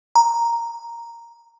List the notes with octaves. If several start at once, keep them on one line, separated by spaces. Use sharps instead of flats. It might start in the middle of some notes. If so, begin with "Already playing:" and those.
A#5